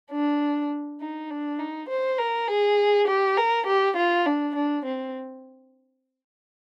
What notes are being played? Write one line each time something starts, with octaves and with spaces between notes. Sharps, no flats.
D4
D#4
D4
D#4
C5
A#4
G#4
G4
A#4
G4
F4
D4
D4
C4